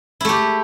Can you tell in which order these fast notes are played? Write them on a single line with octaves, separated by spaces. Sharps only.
E4 A3 G4